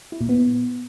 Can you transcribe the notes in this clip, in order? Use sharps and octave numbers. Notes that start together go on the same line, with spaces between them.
E4
A#2
B3